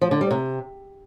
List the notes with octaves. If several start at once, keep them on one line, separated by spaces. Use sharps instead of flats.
F3
D3
G3
C3